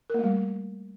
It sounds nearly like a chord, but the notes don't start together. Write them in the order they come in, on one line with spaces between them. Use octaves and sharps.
A#4 A#3 A3 G3